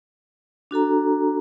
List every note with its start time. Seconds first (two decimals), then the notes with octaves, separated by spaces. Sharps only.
0.71 D4 F#4 A4 A#5